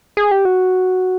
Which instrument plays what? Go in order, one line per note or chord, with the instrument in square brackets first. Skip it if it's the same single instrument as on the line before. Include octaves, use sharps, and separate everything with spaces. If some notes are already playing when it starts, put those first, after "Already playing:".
[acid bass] G#4
G4
F#4